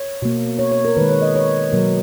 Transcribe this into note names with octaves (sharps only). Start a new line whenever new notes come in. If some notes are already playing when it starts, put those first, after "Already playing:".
Already playing: C#5
B2 A#3
C#5
C#5
A#4
D#3 G#3 B4
C#5
D#5
C#5
B2 F#3 A#3 A#4